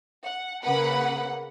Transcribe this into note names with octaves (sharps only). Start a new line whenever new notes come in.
F#5
C#3 A#3 B4 F#5 B5